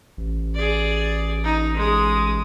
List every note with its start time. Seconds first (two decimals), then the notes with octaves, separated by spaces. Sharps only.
0.17 A1
0.54 G#4 D5
1.44 D#4
1.76 G#3 D#6